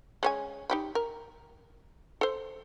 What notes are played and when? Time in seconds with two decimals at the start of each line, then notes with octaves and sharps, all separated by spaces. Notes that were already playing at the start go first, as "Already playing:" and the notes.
0.23 G#3 C#4 G#5
0.70 D#4 G4 B5
0.95 A#4
2.21 A4 C5